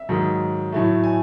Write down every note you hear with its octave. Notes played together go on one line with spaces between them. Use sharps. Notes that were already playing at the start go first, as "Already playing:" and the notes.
Already playing: E5
G#2 D#3 F#3
A2 F#3 A3
G#5